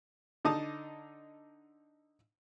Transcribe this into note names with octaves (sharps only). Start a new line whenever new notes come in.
D3 D#4 D#5 A5 D#6